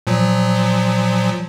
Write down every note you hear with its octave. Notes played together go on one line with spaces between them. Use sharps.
A#2 F3 F#3